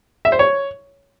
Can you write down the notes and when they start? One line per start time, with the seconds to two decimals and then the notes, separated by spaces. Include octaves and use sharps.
0.25 E5
0.32 C5
0.39 C#5